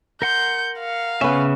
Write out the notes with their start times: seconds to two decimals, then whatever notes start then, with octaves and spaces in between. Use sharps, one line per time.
0.22 A#4 F#5 C6 G6
0.80 F5
1.21 C#3 B3 C#4 E5